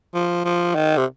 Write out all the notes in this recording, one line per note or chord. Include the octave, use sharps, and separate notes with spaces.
F3
F3
D#3
C3